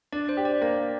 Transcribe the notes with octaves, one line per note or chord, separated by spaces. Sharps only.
D4 D5
C5
G4
D5
A#3 D5